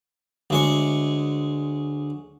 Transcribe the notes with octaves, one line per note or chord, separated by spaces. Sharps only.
D2 G#3 C#5